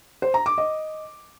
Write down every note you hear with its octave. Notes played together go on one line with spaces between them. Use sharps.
C5
A#5
D6
D#5